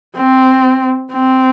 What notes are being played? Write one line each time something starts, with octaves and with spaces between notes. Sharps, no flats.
C4
C4